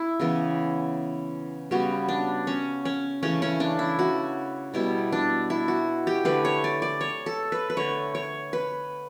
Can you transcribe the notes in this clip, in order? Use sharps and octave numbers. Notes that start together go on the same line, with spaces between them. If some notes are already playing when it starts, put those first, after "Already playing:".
Already playing: E4
C#3 E3 B3
C#3 G3 B3 F#4
D4
C#4
C#4
C#3 E3 A3 C#4
C#4
D4
E4
F#4
B2 G3 B3 E4
D4
E4
F#4
G4
D3 A3 B4
C#5
D5
D5
C#5
A4
B4
B4
D3 A3 C#5
C#5
B4